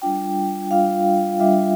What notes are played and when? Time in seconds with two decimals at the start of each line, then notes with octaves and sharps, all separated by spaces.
0.02 G3 D4 F4 G5
0.71 G3 D4 F4 F5
1.40 G3 D4 F4 E5